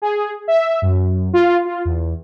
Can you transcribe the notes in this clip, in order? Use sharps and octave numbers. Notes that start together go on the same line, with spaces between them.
G#4
E5
F#2
F4
F4
E2